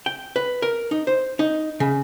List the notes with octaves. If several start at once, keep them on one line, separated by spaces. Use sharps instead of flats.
G5
B4
A#4
D#4
C5
D#4
C#3